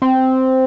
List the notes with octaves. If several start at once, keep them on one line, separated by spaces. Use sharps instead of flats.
C4